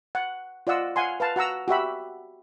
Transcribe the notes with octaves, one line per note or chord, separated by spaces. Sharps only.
F#5
F4 D5 D#5 F#5 E6
F5 F#5 G#5 C6
B4 F5 A5
F#4 F#5 A#5 E6
F#4 G4 E5 B5